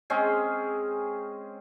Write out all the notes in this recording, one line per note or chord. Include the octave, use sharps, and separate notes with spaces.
G#3 C4 C#4 G#4